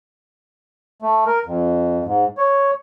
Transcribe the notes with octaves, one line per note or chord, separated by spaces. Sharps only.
A3
A#4
F2
G#2
C#5